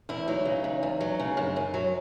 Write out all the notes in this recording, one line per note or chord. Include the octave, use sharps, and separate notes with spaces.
E2 E4
F#3 D#4
C#3
E2
E2
F#3
C#3
F#2
F#2
F#3